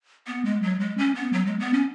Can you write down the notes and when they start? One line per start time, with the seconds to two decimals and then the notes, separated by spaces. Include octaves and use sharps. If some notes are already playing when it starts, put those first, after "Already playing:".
0.27 B3
0.45 G#3
0.63 F#3
0.80 G#3
0.98 C#4
1.15 B3
1.33 F#3
1.47 G#3
1.60 B3
1.73 C#4